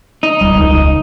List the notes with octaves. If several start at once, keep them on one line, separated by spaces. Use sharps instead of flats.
D#4
D#1 G3
E1 C#2